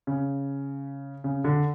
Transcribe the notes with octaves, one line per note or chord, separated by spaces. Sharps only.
C#3
C#3
D3